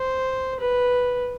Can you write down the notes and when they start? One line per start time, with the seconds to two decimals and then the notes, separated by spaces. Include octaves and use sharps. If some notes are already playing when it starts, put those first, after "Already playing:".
Already playing: C5
0.60 B4